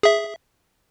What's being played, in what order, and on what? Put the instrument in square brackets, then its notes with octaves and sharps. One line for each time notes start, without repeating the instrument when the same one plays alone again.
[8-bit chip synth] G#4 E5